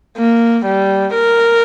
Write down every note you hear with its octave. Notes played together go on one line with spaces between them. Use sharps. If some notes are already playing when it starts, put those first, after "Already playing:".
A#3
G3
A#4